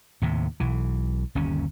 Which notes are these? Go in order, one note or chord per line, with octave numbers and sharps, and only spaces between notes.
D#2 A2 C3
B1 E3
G1 D#2 C3 C#4